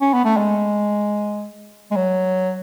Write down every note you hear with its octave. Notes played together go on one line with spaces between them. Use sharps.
C#4
B3
A3
G#3
G#3
F#3